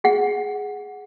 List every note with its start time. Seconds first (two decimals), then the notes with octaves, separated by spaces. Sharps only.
0.04 G#4 F#5